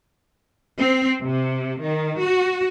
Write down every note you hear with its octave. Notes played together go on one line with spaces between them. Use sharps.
C4
C3
D#3
F#4